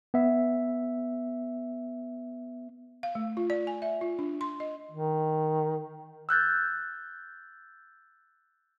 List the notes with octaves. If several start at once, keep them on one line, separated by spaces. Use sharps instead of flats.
B3 E5
F5
A3
F4
D5
G#5
E5
F4
D4
C6
D#5
D#3
E6 F#6 G6 A6